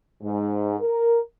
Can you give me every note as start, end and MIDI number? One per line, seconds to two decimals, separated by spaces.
0.22 0.77 44
0.80 1.19 70